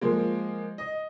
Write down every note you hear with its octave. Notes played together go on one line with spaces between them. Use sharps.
F3 G#3 A#3
D#5